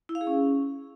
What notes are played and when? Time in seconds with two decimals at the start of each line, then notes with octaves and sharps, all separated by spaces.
0.09 E4
0.15 F5
0.21 G#4
0.27 C#4